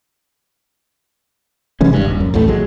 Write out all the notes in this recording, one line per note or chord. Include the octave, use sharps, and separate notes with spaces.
C3 E3 G#3 C#4
G#1 G2
D#1
F#2
A1 D#2 A2 A3
A#1 F#3 G#3